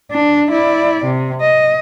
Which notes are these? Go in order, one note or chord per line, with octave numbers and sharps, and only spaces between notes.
D4
E4 D5
C3
D#5